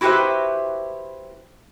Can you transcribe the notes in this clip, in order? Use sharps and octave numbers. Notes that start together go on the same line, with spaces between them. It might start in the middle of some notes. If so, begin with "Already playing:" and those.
E4 F#4 G4 B4 C5 E5